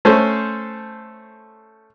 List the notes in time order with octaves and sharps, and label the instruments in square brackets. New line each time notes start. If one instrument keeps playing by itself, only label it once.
[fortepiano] A3 C#4 A4 C5